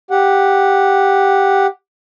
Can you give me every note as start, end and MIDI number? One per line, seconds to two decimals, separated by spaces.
0.11 1.67 67
0.11 1.67 78